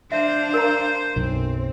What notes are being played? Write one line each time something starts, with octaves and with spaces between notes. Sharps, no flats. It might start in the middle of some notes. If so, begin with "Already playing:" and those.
D4 C5 E5 F5
A#4 A#5
B1 F#2 C4